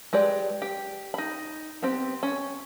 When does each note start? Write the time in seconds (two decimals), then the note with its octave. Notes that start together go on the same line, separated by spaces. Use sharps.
0.13 G#3 G4 B4 D5
0.62 G4
1.14 D#4 B5
1.82 B3 C4 G4
2.23 C#4